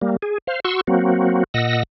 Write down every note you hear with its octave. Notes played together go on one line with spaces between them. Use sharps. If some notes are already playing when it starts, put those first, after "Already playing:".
G3 A#3
G#4
C5 F5
F#4 C6 C#6 E6
F#3 A#3 C4 F#4
A#2 D#5 F#5 E6 A#6